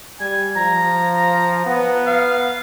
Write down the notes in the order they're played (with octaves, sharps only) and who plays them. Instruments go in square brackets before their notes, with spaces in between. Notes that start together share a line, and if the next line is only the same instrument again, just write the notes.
[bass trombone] G3 [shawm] G#5
[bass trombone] F3 [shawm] A#5
[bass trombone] B3
[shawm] F5